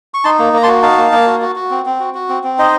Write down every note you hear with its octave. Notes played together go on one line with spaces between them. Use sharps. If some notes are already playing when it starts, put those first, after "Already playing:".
C#6
D#4 A5 C6
A#3
A#3 A#5
A5 C6
F#4
D#4 F5 A5
A#3
A#3
F#4
F#4
F#4
C4
C4
F#4
F#4
C4
C4
D#4 C5 D#5